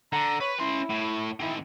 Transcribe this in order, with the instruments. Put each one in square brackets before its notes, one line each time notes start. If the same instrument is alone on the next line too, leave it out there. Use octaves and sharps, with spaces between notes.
[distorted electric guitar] D3 [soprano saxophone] A#5
[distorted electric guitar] B4 [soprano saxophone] C#5
[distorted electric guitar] C#4 C6 [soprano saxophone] E4
[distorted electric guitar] A2
[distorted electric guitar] D#3 C4 [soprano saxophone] E4